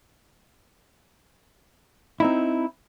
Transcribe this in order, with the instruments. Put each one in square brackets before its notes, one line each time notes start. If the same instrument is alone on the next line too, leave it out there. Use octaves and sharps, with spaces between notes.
[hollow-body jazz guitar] C4 D#4 E4